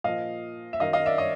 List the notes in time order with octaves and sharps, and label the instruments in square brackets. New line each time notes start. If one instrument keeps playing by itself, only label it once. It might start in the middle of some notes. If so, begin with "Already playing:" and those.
[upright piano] A#2 F3 D#5 F5
E5
F#2 D#3 F#3 D#5 F5
D#5 F5
D5 E5
C#5 D#5